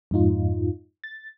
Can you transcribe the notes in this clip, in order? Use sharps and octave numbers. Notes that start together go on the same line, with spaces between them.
F2 G#2 D#4 F4
A6